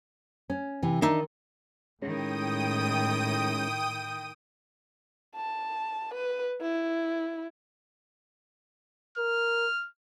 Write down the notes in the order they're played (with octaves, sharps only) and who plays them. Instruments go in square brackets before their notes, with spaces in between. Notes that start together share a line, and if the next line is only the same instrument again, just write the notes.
[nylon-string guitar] C#4
C3 E3
[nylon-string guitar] D#3 [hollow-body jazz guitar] D4 D#4 E5
[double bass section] A2 [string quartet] D#3 E4 [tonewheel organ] G#3 C#4 [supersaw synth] G5 D#6 D#7
[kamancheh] A5
B4
E4
[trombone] A#4 [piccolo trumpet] F6